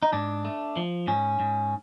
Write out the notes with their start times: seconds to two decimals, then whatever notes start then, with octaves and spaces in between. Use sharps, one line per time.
0.03 D#4
0.13 G#2 D4
0.45 A3
0.77 F3
1.07 G#2 C#4
1.40 G#2